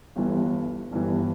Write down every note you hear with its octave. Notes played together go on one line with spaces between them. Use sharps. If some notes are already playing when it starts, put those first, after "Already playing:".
G1 G2 E3
G1 G2 E3